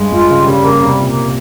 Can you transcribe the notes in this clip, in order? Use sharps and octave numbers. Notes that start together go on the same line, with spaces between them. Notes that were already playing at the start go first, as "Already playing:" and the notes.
Already playing: G2 G#3
G2 F4
C#3
G3
C#3
C#3 A#3
C3 G3
A#2
A#3